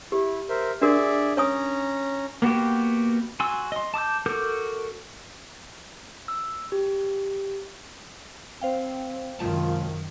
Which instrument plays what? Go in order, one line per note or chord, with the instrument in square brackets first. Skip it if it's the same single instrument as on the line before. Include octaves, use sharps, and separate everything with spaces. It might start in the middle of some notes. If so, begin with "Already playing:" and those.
[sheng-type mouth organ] E4 [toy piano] G4
[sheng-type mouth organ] A#4 C5 E5
[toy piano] D4 F#4 A#4 [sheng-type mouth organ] G#4 D5 E5
[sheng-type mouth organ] C#4 A#5 [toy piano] C#5 G#5 D#6
[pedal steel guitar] A#3 B3 F#4 G4
F#4 G#5 C6 E6
D#5 C6
A5 D6 D#6 G6
F#4 A4 A#4 D6 G6
[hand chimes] E6
G4
[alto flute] C4 [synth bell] C5 F5 G5
[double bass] F#2 D#3 [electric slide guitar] C3 G#3 A5 [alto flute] F4